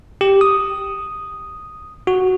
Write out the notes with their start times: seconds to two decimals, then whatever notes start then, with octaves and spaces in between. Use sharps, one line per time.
0.21 G4
0.41 D#6
2.07 F#4